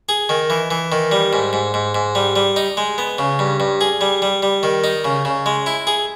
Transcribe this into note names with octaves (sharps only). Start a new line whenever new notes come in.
G#4
D#3
E3
E3
D#3
G3
G#2
G#2
G#2
G#2
G3
G3
D#4
G#3
B3
C#3
G2
G2
G#4
G3
G3
G3
D#3
D#4
C#3
C#3
G#3
E4
G#4